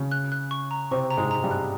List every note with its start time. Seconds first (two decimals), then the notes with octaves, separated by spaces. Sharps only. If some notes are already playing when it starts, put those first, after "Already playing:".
Already playing: C#3 C#4
0.12 F#6
0.32 F#6
0.51 C#6
0.71 A#5
0.91 C3 C4 C#6
1.11 A#5
1.17 G#2 G#3
1.31 A#5
1.44 G2 G3
1.51 F#6